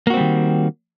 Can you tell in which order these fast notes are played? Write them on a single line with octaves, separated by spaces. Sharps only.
A#3 F#4 C4 G3 D#3